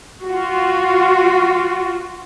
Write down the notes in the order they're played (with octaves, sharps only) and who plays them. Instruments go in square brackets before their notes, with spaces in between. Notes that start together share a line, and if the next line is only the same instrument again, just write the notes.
[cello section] F4 F#4